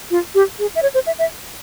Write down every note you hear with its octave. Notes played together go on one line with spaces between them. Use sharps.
F4
G4
G#4
E5
C#5
C5
E5
E5